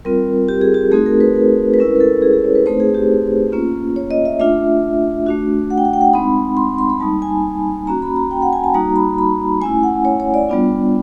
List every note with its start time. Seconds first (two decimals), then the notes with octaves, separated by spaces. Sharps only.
0.05 G3 C4 F4 A#4
0.48 G4
0.61 G#4
0.74 G4
0.92 A3 C4 D#4 F#4 G#4
1.06 A#4
1.21 B4
1.35 A#4
1.74 B4
1.78 G#3 C#4 E4 A#4
1.96 A#4
2.00 A4
2.22 G#4
2.33 G#4
2.44 C#5
2.55 B4
2.66 A3 C4 D#4 C5
2.80 G#4
2.95 G4
3.52 A#3 C#4 F4
3.96 C#5
4.11 D#5
4.25 E5
4.39 A3 D4 F4 E5
5.26 A3 D4 F#4
5.70 F#5
5.78 G5
5.85 F#5
5.93 G5
6.01 F#5
6.13 G#3 C4 D#4 B5
6.57 C6
6.78 C6
6.90 B5
7.00 G3 A#3 D#4 A5
7.22 G#5
7.87 A#3 C#4 F#4 A#5
8.02 B5
8.16 A#5
8.31 G5
8.42 F#5
8.53 G#5
8.64 A5
8.74 G3 A#3 D#4 F#4 A#5
8.96 B5
9.18 B5
9.61 A3 C#4 E4 G#5
9.83 F#5
10.05 C#5
10.20 C#5
10.34 D5
10.49 G3 B3 D4 F4